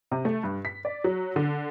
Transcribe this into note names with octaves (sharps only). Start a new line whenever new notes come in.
C3
A3
G2
B6
D5
F#3
D3